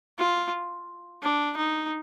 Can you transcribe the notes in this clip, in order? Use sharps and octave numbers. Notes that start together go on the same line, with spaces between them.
F4
D4
D#4